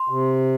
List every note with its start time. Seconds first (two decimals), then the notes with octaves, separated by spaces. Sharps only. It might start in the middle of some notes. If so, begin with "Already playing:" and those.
Already playing: C6
0.09 C3